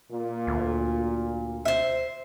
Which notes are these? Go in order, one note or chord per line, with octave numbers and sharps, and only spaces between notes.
A#2
D2
C5 E5